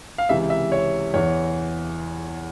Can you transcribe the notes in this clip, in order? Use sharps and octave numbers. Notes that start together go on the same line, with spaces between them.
F5
C#2 C3 E3 E5
E5
C#5
E2 E3 C#5